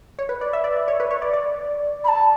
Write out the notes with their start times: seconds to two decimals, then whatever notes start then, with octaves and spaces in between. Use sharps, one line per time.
0.19 C#5
0.29 B4
0.41 D5
0.53 E5
0.64 D5
0.77 D5
0.88 C#5
1.00 B4
1.11 C#5
1.22 D5
1.33 D5
2.04 B5
2.08 A5